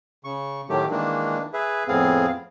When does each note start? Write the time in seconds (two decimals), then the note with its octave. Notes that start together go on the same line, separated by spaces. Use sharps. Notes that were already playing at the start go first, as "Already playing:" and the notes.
0.24 C#3 C#6
0.69 A2 D#3 F#3 A3 G4
0.91 D#3 E3 G#3 A#3 D4
1.53 G#4 B4 E5
1.88 F2 A2 B3 C4 G#4 F5